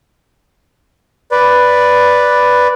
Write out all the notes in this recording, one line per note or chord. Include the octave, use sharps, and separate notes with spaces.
B4 D5